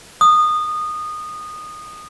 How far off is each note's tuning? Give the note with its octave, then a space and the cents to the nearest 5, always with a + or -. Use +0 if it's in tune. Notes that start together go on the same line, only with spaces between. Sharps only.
D#6 -20